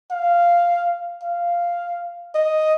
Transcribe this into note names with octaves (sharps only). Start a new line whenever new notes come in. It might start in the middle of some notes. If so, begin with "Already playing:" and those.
F5
F5
D#5